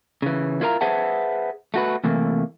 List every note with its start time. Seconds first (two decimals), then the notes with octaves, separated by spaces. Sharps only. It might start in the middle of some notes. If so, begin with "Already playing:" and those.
0.22 C#3 E3
0.61 E4 F4 A#4 B4 A#5
0.81 G#4 B4 C5 E5 F#5 A5
1.74 A3 F#4 B4
2.04 C3 E3 A3 A#3